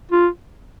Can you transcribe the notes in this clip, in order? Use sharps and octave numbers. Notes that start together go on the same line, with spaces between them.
F4